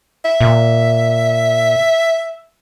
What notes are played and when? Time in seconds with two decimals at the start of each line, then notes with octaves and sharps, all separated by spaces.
0.25 E5
0.41 A#2